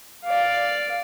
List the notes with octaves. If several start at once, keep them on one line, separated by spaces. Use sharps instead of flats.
D5 F5